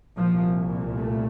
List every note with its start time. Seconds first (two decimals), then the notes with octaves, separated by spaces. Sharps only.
0.17 C2 A#2 F3
0.97 A3